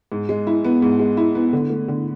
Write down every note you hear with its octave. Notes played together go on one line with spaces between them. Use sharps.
G#2
G#3
E4
B3
G#2
G#3
E4
B3
D3
A3
D3